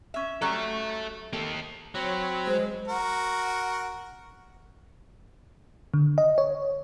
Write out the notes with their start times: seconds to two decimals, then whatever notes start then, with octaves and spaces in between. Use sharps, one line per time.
0.14 C#4 E5
0.42 F#3 G3 C#4 A4 E5
1.33 A#3 G4 A4
1.95 F#3 C4 C#5 B5
2.47 G#3 C5
2.88 F#4 A#4
5.94 D3
6.18 D#5
6.38 C#5